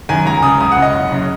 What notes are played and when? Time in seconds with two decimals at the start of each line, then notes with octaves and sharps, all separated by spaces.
0.09 F#2 D#3 G#5
0.25 C#2 A#5
0.42 C#3 D#6
0.60 C#2 D#6
0.72 F#5
0.77 C#3
0.82 D#5
0.93 F#1
1.11 F#2 C#3